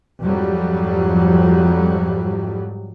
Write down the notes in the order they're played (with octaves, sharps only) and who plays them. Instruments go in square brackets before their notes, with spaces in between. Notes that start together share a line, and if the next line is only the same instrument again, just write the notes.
[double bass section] F2 G#2 F#3 G3